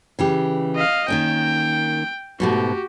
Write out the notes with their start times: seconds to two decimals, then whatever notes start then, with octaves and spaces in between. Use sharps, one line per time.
0.19 C#3 E3 G4
0.76 D#5 F5
1.08 D#3 A#3 C#4 G5
2.40 G#2 B2 A3 F#4 G4